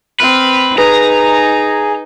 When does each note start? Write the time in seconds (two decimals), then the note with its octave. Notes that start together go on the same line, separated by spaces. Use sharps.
0.20 C4 B4 F6
0.78 D#4 G#4 B4 A#5